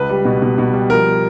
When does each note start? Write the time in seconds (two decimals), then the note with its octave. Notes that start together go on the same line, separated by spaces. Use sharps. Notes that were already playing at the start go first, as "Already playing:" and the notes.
Already playing: C#2 B4
0.09 G3
0.25 B2
0.42 B2
0.58 B2
0.73 G3
0.90 F3 A#4